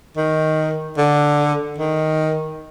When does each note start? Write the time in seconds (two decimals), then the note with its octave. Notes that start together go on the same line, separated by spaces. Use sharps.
0.17 D#3
0.97 D3
1.78 D#3